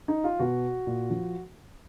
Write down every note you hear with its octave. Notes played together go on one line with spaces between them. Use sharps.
D#4
F4
B2 F#4
A#2
F3